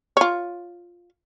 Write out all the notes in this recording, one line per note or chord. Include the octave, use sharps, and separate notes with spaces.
F4 C#5